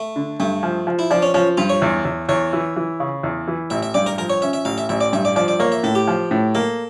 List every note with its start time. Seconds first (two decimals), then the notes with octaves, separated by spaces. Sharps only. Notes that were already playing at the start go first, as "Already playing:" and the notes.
Already playing: A3
0.16 D3
0.40 G2 A3
0.63 F3
0.87 F3
0.99 E4
1.11 F3 D4
1.22 C#4
1.34 F3 C#4
1.57 G2 F4
1.70 C#5
1.82 E2
2.05 E2
2.29 E2 C#5
2.53 E3
2.76 E3
3.00 C#3
3.23 E2
3.48 E3
3.70 A1 E5
3.83 E5
3.94 G2 D5
4.06 A#4
4.18 F3 A#4
4.30 C#5
4.42 C#4 E5
4.53 E5
4.65 A1 F5
4.78 E5
4.89 A1 E5
5.01 D5
5.13 G2 E5
5.25 D5
5.36 F3 D5
5.48 D5
5.60 A#3 C#5
5.72 E5
5.83 A2 A4
5.95 G4
6.08 F3
6.31 A2
6.55 A#3 A4